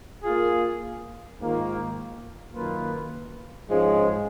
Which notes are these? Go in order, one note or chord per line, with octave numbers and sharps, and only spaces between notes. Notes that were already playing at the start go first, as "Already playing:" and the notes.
A#3 F4 G#4
G#2 D#3 A#3 F4
F#2 D#3 A#3 F4 B4
G#2 F3 G#3 C#4